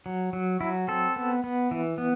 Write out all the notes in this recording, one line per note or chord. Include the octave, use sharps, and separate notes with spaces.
F#3
F#3
F#3 E4
C4 A4
B3
B3
E3
B3